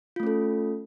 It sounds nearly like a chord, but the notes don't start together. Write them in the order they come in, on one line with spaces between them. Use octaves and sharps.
F4 A3 C#4 A4